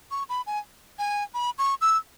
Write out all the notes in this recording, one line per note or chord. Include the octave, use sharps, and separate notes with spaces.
C#6
B5
G#5
G#5
B5
C#6
E6